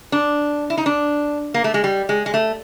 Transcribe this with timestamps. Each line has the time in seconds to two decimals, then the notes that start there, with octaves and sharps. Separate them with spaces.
0.12 D4
0.70 E4
0.78 D#4
0.86 D4
1.54 A#3
1.64 A3
1.74 G#3
1.84 G3
2.09 G#3
2.26 G#3
2.34 A3